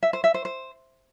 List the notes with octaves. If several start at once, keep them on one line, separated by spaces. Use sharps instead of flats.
E5
C5
E5
C5
C5